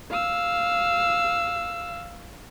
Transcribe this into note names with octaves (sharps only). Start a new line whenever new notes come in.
F5 E6